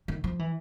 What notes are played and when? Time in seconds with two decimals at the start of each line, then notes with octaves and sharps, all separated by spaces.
0.08 D#3
0.24 F3
0.39 E3